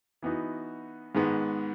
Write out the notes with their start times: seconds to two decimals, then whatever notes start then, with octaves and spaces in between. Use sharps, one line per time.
0.22 E3 B3 D#4 F#4
1.15 G#2 D#3 G#3 B3